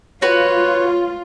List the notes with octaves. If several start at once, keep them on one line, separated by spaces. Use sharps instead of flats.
F4 F#4 B4 C#5